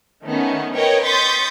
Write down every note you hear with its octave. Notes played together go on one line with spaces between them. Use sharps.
D#3 A3 B3 C#4
A#4 B4 C#5 D#5 G5
C6 C#6 D#6 G6 A6 B6